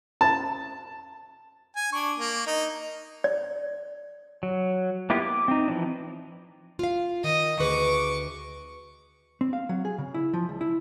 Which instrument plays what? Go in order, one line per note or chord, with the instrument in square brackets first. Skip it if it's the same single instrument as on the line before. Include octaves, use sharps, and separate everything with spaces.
[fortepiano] A5
[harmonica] G#5
D4 C#6
A#3
D#4
[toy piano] D5
[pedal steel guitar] F#3
A#3 B3 E4 F4 G4
D6
C4 D#4
E3 F3 D4
[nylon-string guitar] F4 F5
[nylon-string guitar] D#3 [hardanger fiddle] D#5
[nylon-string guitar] D2 G#4 B4 [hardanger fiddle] C#6 D6
[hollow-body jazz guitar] C4
F5
F#3
G#4
C#3
E4
F3
C#2
E4